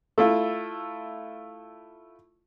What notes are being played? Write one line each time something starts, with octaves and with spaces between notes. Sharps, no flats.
A3 E4 F4